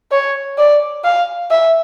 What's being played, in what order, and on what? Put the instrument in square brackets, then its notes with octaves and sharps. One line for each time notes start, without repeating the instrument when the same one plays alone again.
[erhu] C#5
D5
F5
E5